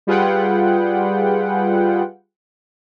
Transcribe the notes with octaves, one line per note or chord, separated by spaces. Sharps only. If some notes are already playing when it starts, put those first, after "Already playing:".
G3 F4 G#4 B4 F#5 G5